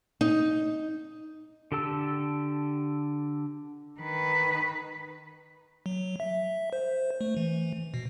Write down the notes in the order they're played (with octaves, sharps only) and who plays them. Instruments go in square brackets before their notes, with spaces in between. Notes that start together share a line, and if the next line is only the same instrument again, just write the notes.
[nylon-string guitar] D#4
[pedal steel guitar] D3 G4 A4 A5 E6
[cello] D#3 B4
[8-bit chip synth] F#3
E5
C5
A3
E3
B2